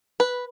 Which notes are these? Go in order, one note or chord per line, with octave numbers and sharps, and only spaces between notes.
B4